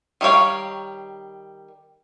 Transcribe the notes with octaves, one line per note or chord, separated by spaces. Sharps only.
D#3 G3 C4 C#5 F5